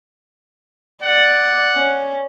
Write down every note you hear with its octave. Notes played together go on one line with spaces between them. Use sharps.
D5 F#5
C#4